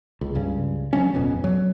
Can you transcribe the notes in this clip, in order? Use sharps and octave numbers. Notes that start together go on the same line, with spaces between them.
C#2
C#2 G2 C#3
F3 F#3 A#3 C#4
D1 F2 B2 C#4
F#3